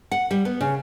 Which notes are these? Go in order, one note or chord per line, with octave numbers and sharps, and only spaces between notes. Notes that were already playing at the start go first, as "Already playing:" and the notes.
F#5
G3
B3
C#3